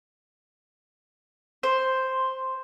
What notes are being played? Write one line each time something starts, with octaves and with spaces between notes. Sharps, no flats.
C5